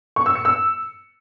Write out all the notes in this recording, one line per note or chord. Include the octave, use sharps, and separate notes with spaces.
C#6
E6
C#7
E6